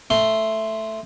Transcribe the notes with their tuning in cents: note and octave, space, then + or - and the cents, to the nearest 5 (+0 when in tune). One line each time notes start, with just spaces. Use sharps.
A3 +0 C6 +0